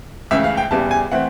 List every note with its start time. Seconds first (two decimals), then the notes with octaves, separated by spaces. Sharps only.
0.31 C#2 C#3 E3 A3 E5
0.44 F5
0.57 G5
0.71 E2 C#3 E3 G3 A5
0.91 G#5
1.12 E3 A3 C4 F#5